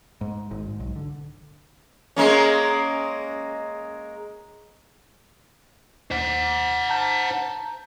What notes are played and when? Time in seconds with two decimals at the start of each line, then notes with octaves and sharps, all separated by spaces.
0.21 G#2
0.51 G#1
0.68 G#2
0.80 B1
0.96 D3
2.16 G#3 A#3 C#4
6.11 D#2 C5 F#5
6.90 A5 A#5 G6